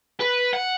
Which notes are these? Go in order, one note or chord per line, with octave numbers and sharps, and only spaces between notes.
B4
F#5